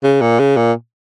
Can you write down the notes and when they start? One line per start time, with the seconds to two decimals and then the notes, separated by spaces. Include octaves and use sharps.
0.03 C#3
0.21 A#2
0.40 C#3
0.57 A#2